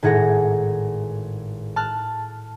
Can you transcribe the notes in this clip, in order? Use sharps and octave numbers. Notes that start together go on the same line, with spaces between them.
G#1 A2 G#4 F#5 A#6
A5 F6 F#6